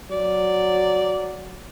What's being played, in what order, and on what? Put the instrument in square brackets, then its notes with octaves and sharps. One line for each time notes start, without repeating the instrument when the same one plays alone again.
[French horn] F#3 [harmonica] D5